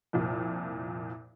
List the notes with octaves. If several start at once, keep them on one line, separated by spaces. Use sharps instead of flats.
C2 F2 A#2